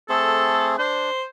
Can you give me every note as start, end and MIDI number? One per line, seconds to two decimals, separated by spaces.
0.09 0.76 57
0.09 0.76 60
0.09 0.76 68
0.09 0.69 69
0.78 1.10 62
0.78 1.24 72